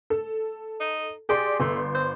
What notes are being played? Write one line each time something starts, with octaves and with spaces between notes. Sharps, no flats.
A4
D#4
G4 G#4 D5 C6
G1 A3 C6
C5